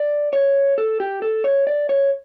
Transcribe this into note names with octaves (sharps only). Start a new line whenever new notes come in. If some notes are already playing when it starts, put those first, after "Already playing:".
Already playing: D5
C#5
A4
G4
A4
C#5
D5
C#5